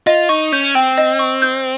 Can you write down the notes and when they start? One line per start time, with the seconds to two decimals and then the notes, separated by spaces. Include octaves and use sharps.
0.07 F4 D#5
0.29 D#4 C#6
0.52 C#4 G6
0.75 C4 G5
0.98 D#5
1.19 C#6
1.42 G6